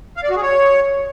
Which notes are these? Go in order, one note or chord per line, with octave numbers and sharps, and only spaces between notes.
F5
D5
F#4
G#4
C#5